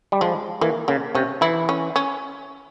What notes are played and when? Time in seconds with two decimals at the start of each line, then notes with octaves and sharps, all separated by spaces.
0.12 G3
0.21 F3 G#3
0.61 E3 A#3
0.88 C#3 A#3
1.15 C3 C#4
1.41 E3 E4
1.69 C#4
1.96 C#4